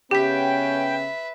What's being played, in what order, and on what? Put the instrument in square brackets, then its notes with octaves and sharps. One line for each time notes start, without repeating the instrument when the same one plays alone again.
[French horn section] C#3 B3 C#4 [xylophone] G4 B6 [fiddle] B4 E5 [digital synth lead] G5